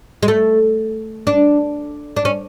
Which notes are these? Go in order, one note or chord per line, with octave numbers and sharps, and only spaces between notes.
G#3
A3
D4
D4
C#4